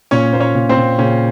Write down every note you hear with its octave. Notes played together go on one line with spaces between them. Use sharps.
A#2 C#4 C#5
A#3 C5
C#4 C#5
A#2
C4 C5
A#2
A#2 C#3 C#4